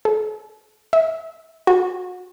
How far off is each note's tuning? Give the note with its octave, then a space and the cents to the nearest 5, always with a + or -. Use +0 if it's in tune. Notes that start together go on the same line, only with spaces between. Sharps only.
A4 -45
E5 -30
F#4 -30